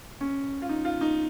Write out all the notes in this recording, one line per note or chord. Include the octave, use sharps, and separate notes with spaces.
C#4
F4
D#4
F4
D#4